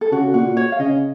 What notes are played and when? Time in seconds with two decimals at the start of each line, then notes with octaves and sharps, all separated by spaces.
0.01 A4
0.12 C#3 F#4
0.34 A#2 F#4
0.57 C#5
0.72 F5
0.79 C#3 D#5